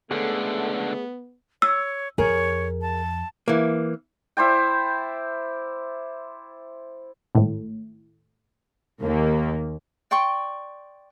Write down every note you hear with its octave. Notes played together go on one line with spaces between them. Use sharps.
C#2 D3 A3 B3 G#4 C#5 F#5
C#5 E6
F2 G#4 A#4 C#5
A5
E3 A#3
E4 C5 D5 G5
G#1 A2
D#2 A#3
D5 G5 C6 C#6